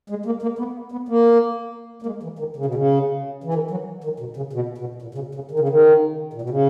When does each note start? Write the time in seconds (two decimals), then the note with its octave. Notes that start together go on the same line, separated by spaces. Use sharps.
0.10 G#3
0.26 A#3
0.42 A#3
0.59 B3
0.92 B3
1.08 A#3
2.02 A#3
2.06 G#3
2.23 E3
2.39 D#3
2.56 C#3
2.65 B2
2.75 C#3
3.44 E3
3.54 D#3
3.71 F#3
4.04 D#3
4.20 B2
4.36 C#3
4.53 B2
4.78 B2
5.02 A#2
5.15 C#3
5.18 B2
5.35 C#3
5.51 D#3
5.59 C#3
5.69 D#3
6.33 A#2
6.42 B2
6.50 C#3